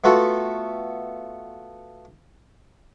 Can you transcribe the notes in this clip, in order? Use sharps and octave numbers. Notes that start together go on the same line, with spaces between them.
A3 B3 F4 F#4 A4